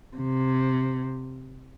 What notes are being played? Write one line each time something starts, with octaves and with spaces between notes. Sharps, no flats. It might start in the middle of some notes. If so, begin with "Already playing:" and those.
C3